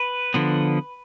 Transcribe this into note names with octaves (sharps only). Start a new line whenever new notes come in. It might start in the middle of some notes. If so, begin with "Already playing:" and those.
Already playing: B4
D3 F3 B3